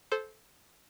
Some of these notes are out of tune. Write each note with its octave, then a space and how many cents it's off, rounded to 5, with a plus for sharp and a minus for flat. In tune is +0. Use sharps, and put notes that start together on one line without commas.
A4 -20 C5 +0